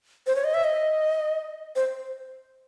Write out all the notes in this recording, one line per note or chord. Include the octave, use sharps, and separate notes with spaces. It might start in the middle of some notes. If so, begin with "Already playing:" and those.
C5
C#5
D#5
E5
D#5
C5